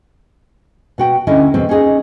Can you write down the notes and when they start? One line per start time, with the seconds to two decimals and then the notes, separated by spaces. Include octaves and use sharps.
0.98 B2 F#4 G5
1.27 D2 D3 C#4 E4 D#5
1.54 E2 B2 C4
1.69 C#4 D#4 G#4 D#5